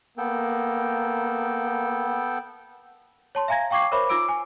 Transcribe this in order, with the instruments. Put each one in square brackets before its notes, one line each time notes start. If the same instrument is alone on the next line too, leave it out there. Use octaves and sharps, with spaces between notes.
[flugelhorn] A#3 [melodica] B3 A4 G5
[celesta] C#5 A5 C6
E5 F5 G#5 A#5 G#6 A#6
F5 G5 C#6 D6 G#6 C7
A#4 C5 C#5 E5 B5 D6
D#4 F4 D6 E6 D7
G#5